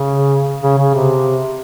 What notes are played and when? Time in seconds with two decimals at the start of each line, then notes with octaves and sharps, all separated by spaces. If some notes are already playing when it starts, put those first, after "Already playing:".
Already playing: C#3
0.63 C#3
0.78 C#3
0.94 C3